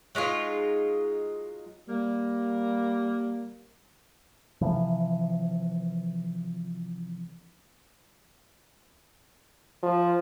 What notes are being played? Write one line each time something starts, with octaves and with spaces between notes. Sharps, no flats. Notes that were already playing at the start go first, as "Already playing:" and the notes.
F#3 G#3 D#4 F4
G3 A#3
C3 E3 F3
F3